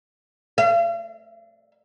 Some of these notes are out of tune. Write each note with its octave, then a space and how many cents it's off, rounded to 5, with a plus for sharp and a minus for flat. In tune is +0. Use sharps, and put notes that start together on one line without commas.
F5 -45